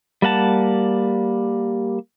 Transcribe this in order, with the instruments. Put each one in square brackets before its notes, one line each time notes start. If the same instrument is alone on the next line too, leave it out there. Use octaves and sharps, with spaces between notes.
[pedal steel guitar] G3 A#3 F#5 A5